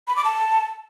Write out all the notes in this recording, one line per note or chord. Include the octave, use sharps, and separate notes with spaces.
B5
D6
A5